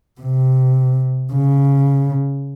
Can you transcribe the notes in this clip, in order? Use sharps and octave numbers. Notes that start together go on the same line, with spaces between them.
C3
C#3